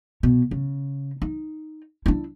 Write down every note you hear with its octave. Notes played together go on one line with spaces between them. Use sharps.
B2
C#3
D#4
D4 E4